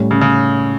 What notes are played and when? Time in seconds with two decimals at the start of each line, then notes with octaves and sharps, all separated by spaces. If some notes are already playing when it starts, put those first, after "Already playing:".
Already playing: A2 G3 C#4
0.11 C#3
0.21 C#3